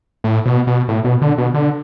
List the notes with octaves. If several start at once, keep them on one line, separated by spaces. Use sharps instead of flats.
A2
B2
B2
A2
B2
D3
B2
D3